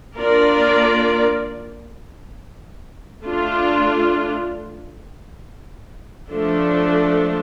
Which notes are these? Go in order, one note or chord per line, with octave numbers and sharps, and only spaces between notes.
A#3 D4 F4 A#4 D5
A3 D4 F4
F3 A3 D4 A4